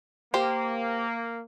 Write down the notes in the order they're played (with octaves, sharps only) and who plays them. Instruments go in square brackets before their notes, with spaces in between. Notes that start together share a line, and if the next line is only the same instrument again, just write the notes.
[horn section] A#3 [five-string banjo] G4 C5